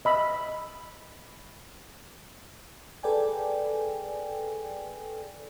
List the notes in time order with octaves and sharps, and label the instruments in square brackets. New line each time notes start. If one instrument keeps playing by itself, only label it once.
[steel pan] D#5 B5 E6
[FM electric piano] G#4 A4 B4 D5 G5 G#5